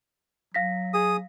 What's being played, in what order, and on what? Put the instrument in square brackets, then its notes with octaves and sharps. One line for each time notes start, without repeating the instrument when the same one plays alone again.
[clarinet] F#3 [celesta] F5 A#6 B6
[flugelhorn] G#4 [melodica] D#6